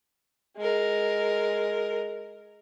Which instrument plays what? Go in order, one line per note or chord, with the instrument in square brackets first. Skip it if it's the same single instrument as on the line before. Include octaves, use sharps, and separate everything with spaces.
[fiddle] G#3 A#4